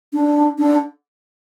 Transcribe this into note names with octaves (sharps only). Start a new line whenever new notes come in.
D4
D4